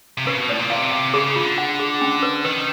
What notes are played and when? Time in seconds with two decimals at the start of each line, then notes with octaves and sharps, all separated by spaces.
0.18 C3
0.27 C#3 B4
0.38 B2
0.49 A2 D5
0.59 A#2
0.70 C3 F5
0.92 F5
1.14 C#3 G#4
1.36 D3 F4
1.58 F#5
1.79 G#4
2.01 C#4
2.22 B4
2.44 D#3 B4